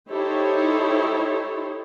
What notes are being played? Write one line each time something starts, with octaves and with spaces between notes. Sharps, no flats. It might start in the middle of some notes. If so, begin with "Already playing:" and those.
D#4 E4 G4 A4 C5 C#5